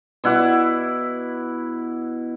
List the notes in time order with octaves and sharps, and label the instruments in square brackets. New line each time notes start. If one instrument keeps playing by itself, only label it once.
[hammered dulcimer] B2 E4 F#5 D6